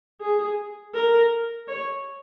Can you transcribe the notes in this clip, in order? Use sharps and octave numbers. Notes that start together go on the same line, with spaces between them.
G#4
A#4
C#5